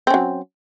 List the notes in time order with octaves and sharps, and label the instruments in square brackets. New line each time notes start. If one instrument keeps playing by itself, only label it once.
[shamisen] C4
C#4
F#3